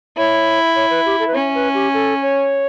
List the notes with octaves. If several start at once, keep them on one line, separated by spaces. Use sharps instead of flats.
E4 C#5
C#5
B4
G4
A4
B4
C#4 C#5
B4
G4
A4
C#5